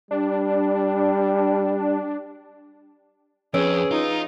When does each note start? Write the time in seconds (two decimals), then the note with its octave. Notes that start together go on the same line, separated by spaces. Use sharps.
0.11 G3 D4
3.54 F2 C#4 G#4 B4 E6 D7
3.91 D#4 F4